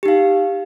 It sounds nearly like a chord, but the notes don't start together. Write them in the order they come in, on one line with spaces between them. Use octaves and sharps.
G4 D#4 F5